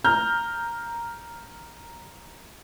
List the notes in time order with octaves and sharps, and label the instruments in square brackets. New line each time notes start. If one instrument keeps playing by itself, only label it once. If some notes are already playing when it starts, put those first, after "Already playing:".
[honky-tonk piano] A#5 F6 G6